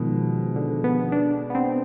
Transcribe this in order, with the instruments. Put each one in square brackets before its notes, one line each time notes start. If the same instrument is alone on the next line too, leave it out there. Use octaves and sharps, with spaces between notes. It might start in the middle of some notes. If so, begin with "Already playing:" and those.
Already playing: [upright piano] B2 G#3 [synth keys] D#3 F3
[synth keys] D3
B3
D4
B3
C4